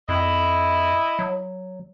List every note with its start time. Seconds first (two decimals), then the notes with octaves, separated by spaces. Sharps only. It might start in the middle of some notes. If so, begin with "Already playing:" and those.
0.09 F2 E4 D#5
1.19 F#3